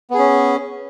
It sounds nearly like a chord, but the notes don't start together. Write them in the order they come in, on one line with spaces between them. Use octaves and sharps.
B3 G#4 C#4